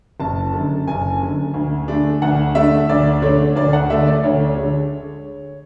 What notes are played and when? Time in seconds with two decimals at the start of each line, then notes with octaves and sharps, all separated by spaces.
0.20 F#1 A5
0.53 F#2 D3
0.87 F#1 G#5
1.21 F#2 D3
1.54 D2
1.88 D3 A3 D4
2.22 D2 F#5
2.55 D3 A3 D4 E5
2.89 D2 D5
3.22 D3 A3 D4 C#5
3.55 D2 D5
3.73 F#5
3.90 D3 A3 D4 E5
4.07 D5
4.24 D2 C#5
4.57 D3 G#3